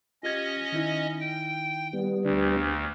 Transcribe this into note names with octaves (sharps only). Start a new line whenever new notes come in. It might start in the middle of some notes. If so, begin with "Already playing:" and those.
C#4 F4 G4 D#5 G#6
D#3 D#4 E4
G5
G3 B3
D2 D3 D4